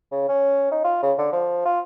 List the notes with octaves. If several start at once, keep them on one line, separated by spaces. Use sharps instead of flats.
C#3
C#4
D#4
F4
C#3
D3
F3
F4